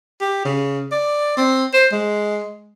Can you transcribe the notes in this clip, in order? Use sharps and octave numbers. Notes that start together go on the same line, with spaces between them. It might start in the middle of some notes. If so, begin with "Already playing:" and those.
G4
C#3
D5
C4
C5
G#3